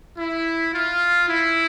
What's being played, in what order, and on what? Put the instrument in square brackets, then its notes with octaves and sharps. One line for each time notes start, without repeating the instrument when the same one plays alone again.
[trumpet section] E4
F4
E4